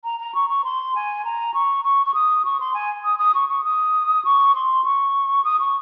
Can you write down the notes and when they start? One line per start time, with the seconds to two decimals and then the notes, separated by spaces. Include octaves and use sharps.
0.04 A#5
0.20 A#5
0.35 C#6
0.50 C#6
0.64 C6
0.95 G#5
1.25 A#5
1.54 C#6
1.84 C#6
2.06 C#6
2.14 D#6
2.45 C#6
2.60 C6
2.74 G#5
3.05 D#6
3.19 D#6
3.34 C#6
3.49 C#6
3.64 D#6
4.25 C#6
4.55 C6
4.84 C#6
5.45 D#6
5.60 C#6